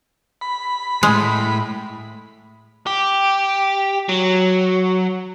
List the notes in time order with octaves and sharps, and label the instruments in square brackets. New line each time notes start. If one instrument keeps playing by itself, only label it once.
[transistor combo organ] B5
[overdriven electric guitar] A2 [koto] G#3
[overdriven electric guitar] G4
F#3